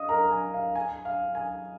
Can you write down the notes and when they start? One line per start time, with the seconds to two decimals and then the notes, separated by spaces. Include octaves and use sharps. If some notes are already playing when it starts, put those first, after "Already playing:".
Already playing: D#5 F5 D#6
0.09 A#4 A#5
0.31 G#5
0.54 F5
0.75 G#5
1.05 F5
1.35 G#5